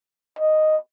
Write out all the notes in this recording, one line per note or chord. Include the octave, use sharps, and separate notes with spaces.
D#5